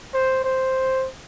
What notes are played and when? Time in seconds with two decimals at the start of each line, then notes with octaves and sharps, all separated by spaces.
0.14 C5
0.44 C5